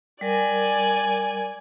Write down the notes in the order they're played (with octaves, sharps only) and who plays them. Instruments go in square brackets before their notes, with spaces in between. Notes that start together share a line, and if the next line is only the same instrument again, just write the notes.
[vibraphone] G3 A#4 [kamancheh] D5 G#5